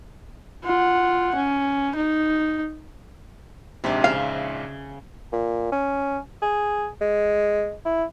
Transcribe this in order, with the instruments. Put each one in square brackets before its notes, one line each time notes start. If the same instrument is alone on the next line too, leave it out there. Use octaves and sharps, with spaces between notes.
[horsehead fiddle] F4 F#5
C#4
D#4
[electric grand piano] A#1 G#2 [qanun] C3 D4
[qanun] C#3 E5 [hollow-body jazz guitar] F5
[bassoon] A#2
C#4
G#4
G#3
E4